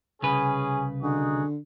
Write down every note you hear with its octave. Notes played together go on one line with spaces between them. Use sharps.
C2 C#3 C#4 G#4 B4
D3 D#4 F#4 G#4